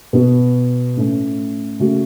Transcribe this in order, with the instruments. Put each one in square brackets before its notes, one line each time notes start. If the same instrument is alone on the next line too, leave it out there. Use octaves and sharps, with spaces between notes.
[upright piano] B2 B3 F#4
A2 A3 C#4
C#3 A3 F#4